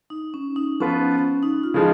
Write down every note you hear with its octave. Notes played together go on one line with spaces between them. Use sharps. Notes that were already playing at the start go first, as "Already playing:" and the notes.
D#4
C#4
D#4
F3 B3 C#4 F4 B4
C#4
D#4
F4
C#3 F3 G#3 D#4